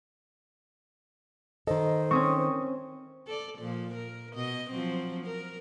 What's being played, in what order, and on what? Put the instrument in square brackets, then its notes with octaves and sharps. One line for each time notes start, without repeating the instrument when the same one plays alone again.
[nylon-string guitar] D#3 A4 [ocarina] C5 [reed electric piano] D#5
[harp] C4 C#4 [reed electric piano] C#6 D#6
[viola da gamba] A4 D5
A#2 F3
A#4
B2 D#5
F3 F#3 C4
A#4